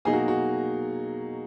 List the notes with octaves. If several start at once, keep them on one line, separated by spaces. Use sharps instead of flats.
B2 F#3 A#3 D#4 G#4
F#4
F#4